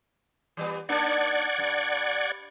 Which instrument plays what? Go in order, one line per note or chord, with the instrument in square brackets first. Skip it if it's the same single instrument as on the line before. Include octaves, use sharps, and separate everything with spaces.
[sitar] E3 G3 B3
[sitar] A#3 D4 D#4 [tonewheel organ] D5 F#5 G#6
[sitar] G2